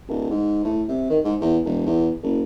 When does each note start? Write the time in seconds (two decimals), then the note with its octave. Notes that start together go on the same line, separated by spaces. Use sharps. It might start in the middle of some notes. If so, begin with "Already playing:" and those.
0.08 D1
0.30 G#2
0.64 A2
0.88 C3
1.09 D#3
1.24 G#2
1.40 E2
1.64 E1
1.86 E2
2.22 F#1